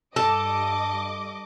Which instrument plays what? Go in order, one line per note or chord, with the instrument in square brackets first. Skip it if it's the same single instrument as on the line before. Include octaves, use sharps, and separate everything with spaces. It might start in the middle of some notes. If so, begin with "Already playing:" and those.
[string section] G2 D#5 D6 [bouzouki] A4